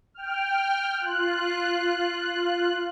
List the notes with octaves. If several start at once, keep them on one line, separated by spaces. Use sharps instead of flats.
G5 F6
F4 F#6